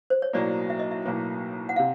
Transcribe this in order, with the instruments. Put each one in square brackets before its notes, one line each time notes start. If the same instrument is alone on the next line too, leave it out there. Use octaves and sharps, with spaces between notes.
[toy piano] C5
C#5
[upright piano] B1 A2 F#3 A#3 [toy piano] D5
[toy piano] E5
D#5
E5
[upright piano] B1 A2 F#3 A#3
[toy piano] F#5
[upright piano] C3 [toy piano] F5